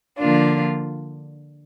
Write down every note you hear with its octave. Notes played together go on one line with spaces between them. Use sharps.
D3 F3 A#3 D4 F4